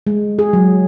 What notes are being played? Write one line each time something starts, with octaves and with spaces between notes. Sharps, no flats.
G#3
G#4
F#3